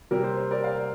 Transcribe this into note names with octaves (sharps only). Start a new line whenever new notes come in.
C3 G3 A#3 A#4
C5
C5
A#4 D5
D5 F5